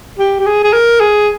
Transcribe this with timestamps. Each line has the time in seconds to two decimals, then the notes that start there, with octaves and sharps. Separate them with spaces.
0.19 G4
0.40 G4
0.46 G#4
0.64 G#4
0.73 A#4
1.00 G#4